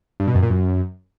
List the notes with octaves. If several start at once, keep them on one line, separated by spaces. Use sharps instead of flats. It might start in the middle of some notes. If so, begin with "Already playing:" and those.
G2
B2
F#2
A#2
F#2